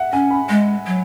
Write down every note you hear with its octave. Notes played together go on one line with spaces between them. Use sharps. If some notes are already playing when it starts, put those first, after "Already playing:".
Already playing: E5 F#5
C#4 G#5
B5
G#3
F#3